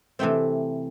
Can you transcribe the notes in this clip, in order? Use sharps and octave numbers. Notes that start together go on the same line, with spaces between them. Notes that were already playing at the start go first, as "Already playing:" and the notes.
C3 E3 A3 C4 G5